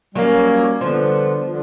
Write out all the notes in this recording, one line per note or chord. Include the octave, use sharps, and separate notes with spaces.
F#3 G3 A#3 C#4
D3 F3 G3 B3
D3